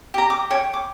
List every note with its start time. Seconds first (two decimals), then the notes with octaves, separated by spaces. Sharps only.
0.14 G4 A#5
0.30 D6
0.50 C#5 G5
0.73 D6